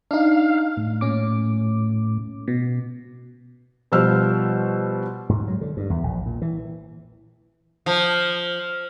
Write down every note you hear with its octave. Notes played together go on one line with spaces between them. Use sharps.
D4 D#4 F5
A2
A#2 C#4 D6
B2
B2 F3 G3 C5 E6 F6
G#2
F#3
D3
G2
E2
A#1
A#2
E3
F3